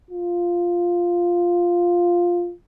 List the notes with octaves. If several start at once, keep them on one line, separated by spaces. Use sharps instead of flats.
F4